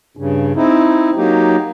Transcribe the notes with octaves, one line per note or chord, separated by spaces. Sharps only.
G2 C#3
C4 D#4 E4
F#3 A#3 D#4 G4